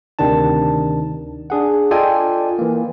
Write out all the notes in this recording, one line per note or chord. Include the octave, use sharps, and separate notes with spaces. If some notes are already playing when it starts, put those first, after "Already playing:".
D2 C3 D#3 D4 A5
D4 G#4 F#5
F4 A4 D5 D#5 G5 G#5
E3 A#3